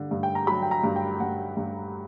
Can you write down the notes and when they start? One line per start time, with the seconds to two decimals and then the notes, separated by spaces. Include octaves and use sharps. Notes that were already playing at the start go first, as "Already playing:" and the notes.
Already playing: G2 D3
0.11 G2
0.23 G5
0.35 A#5
0.47 F#3 B5
0.62 G5
0.71 A#5
0.83 G2
0.96 G5
1.20 G2 F#5
1.57 G2